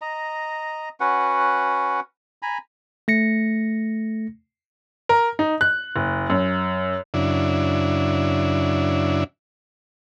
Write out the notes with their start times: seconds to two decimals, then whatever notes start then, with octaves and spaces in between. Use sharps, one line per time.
0.01 D#5 A#5
1.00 C#4 F#4 B4 F#5
2.42 G#5 A#5 B5
3.08 A3 A#6 C#7
5.09 A#4
5.39 D#4
5.61 F#6
5.96 F#1
6.30 F#2
7.14 F#2 C#3 D4 E4